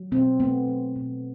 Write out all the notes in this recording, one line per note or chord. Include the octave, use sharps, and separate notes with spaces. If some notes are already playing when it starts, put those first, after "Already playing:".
Already playing: F#3
B2 C4
A3 B3
F#3
B2